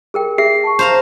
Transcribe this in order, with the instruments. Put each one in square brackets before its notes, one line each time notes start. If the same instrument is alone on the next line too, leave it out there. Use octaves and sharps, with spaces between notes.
[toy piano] G#4 A#4 G5
[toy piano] G#4 E5 [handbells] C7
[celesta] A5 C#6
[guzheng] C5 F5 A#5